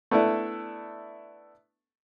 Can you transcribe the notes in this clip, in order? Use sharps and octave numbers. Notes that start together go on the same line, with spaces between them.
A3 B3 D4 E4 A4